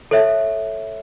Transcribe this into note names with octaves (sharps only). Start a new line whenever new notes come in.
A4 C#5 E5